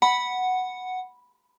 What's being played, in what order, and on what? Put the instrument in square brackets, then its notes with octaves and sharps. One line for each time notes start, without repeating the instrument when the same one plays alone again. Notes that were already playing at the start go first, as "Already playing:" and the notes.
[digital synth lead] F#5 [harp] B5